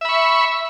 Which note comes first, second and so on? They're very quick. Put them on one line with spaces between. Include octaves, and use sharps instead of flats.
E5 B5 C#6